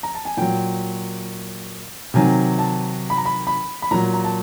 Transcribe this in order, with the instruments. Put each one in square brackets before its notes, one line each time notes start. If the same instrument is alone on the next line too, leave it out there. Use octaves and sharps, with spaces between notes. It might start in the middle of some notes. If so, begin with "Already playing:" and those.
[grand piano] A#5
A5
G#5
A#2 F#3 G5
C3 D#3 F#3 G#5
A5
B5
A#5
B5
B5
B5
A#2 F#3 A#5
A#5
A5